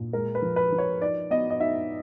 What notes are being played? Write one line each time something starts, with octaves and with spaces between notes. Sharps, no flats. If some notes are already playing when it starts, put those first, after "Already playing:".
Already playing: A#2
G#3 A#4
B4
F3
B4
F3
C#5
D#4 D5
B3 D#5
D#5
D#4 E5